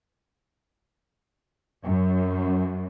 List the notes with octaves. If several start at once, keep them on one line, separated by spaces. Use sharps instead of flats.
F#2